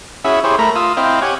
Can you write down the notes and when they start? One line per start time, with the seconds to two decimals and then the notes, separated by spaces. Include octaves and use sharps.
0.25 C#4 E4 F#4 G#4 E5
0.44 E4 G4 G#4 C5 C#5
0.59 A3 A#4 A#5 B5
0.76 F4 D#6 E6
0.97 C4 E4 D#5 F5 G5
1.22 G4 C#5 F#5 G#5